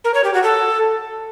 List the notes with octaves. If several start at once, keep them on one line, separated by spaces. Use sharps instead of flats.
A#4
C#5
G4
F#4
A4